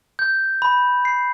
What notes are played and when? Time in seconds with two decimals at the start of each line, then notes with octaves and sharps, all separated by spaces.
0.19 G6
0.62 B5
1.05 C7